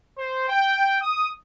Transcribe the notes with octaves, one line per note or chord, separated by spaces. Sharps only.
C5
G5
D#6